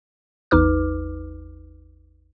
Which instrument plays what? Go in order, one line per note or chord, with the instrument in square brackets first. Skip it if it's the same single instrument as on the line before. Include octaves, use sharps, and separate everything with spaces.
[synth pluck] A1 E2 D#4 B4 D6 F6